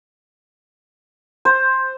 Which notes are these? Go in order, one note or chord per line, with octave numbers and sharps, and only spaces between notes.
C5